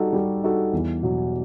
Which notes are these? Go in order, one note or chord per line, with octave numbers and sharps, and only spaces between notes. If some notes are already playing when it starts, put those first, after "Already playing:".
Already playing: G3 D#4 F#4 A4
G3
D#4 F#4 A4
E2
B2 F#3